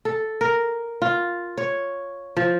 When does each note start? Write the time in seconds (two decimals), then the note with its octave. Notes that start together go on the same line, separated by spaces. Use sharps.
0.05 A4
0.41 A#4
1.02 F4
1.58 C#5
2.37 F3